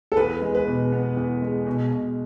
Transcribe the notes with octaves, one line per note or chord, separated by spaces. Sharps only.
A4
E2 B4
G#3
B4
B2
B3
E2
G#3
B2
B2